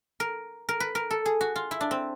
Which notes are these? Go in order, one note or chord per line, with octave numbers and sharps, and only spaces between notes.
A#4
A#4
B4
A#4
A4
G#4
F#4
F4
E4
D4
C4